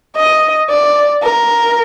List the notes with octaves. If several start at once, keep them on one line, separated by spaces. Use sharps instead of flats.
D#5
D5
A#4